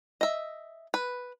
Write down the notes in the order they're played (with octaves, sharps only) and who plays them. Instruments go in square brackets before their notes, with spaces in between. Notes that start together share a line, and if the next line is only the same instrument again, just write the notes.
[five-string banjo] D#5 E5
B4